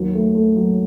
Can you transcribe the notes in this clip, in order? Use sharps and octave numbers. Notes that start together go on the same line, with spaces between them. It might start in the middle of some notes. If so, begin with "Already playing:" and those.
Already playing: D#2 F#3
A3
A3
F#3